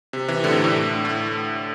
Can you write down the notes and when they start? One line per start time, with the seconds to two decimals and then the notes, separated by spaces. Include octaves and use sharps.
0.13 C3
0.28 C3 E3
0.44 A2 D3
0.53 C3
0.64 A2 D3
1.05 A2